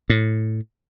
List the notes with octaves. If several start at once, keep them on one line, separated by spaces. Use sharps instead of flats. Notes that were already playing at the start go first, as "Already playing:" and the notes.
A2